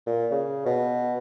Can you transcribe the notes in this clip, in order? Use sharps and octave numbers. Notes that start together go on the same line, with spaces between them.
A#2
C#3
B2